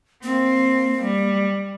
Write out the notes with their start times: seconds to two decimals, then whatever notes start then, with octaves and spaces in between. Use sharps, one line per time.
0.23 A#3 C4
1.02 G3